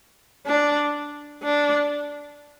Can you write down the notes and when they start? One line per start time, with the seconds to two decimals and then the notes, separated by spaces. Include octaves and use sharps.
0.46 D4
1.43 D4